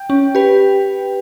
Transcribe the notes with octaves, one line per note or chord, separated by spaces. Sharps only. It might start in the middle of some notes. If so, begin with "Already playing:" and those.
Already playing: G5
C#4
G4 B4